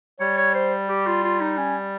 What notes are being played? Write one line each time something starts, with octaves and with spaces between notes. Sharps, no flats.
G3 C#5
C#5
C5
G4
F4
F4
D#4
C#4